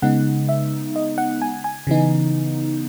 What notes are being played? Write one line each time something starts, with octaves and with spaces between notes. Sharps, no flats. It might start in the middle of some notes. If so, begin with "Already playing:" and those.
C#3 G#3 B3 D#4 F#5
E5
D#5
F#5
G#5
G#5
C#3 E3 B3 D#4